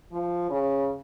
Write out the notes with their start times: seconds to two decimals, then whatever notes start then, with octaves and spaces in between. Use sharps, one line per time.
0.12 F3
0.50 C#3